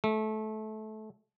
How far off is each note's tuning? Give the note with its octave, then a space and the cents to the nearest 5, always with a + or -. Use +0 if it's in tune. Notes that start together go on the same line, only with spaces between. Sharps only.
A3 -20